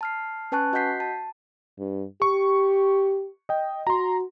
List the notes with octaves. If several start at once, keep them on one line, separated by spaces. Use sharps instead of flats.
A5 F6 C7
C#4 B4 G#5 A5 C#6 F#6
F#4 D#5 F#5 G6 B6 C7
A5
G2
G4 C#6
D#5 G5
F#4 A#5 C6